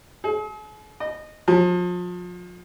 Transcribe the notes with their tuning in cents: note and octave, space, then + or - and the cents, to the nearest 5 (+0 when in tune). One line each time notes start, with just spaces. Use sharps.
G#4 +45
D#5 -20
F3 +35